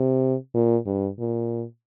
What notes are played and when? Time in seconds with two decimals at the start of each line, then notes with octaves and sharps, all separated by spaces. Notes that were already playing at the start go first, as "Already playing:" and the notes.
Already playing: C3
0.54 A#2
0.86 G2
1.19 A#2